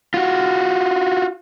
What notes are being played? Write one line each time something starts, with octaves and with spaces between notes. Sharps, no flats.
F4 F#4